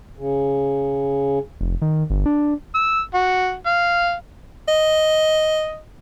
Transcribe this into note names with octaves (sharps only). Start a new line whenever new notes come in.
C#3
F1
D#3
G1
D4
E6
F#4
F5
D#5